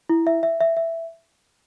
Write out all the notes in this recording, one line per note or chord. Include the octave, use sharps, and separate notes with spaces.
E4
E5
E5
E5
E5